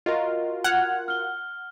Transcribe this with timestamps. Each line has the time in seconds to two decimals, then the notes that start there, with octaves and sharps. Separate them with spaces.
0.06 F4 F#4 A#4 D#5
0.64 F#5 F6 G#6 F7
1.08 F6 G7